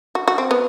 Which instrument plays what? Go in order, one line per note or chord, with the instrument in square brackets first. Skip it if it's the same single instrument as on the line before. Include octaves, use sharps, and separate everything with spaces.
[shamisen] F#4
F#4
C4
B3